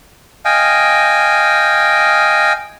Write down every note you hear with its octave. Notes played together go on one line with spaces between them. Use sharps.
D#5 F5 G5 G#5